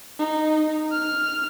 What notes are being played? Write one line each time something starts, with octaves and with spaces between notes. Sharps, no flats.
D#4
F6